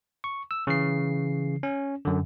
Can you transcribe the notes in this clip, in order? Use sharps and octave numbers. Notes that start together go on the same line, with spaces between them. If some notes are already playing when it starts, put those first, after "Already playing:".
C#6
E6
C#3 E3 C7
C#4
F#2 D3